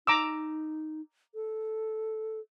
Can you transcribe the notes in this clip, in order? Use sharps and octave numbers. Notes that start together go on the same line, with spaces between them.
D#4 A#5 D6 E6
A4